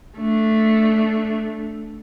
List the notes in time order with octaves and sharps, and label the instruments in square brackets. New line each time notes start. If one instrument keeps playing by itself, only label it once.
[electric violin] A3 D4